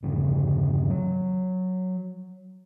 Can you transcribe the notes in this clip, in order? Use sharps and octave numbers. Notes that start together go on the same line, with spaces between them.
G1 E2 C#3
F#3